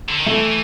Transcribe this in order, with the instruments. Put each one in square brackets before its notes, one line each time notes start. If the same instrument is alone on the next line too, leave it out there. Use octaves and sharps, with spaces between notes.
[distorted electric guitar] D3
D#3
[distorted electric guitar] E3 [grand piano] A3